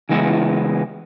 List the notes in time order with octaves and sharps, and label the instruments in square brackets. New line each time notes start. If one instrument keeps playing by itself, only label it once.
[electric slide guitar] C#3 E3 G#3 B3 E4